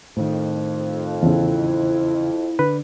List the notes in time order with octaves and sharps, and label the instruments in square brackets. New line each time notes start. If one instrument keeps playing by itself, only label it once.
[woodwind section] F2 [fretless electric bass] A2 D#3
[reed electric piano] E2 C#3 [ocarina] E4
[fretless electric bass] D3 [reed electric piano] B4